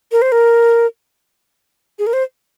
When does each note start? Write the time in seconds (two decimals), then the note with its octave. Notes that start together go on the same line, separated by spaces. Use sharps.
0.12 A#4
0.22 C5
0.32 A#4
1.99 G#4
2.07 A#4
2.13 C5